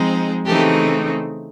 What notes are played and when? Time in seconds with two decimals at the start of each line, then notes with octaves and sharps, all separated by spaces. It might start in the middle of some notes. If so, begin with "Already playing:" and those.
Already playing: F3 G#3 C4 D#4
0.46 C#3 E3 A3 C4 D#4 G4 A4